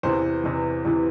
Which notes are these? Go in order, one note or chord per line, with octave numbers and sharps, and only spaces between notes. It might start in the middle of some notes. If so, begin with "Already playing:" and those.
E2 C3 E3 C5
E2 C3 E3
E2 C3 E3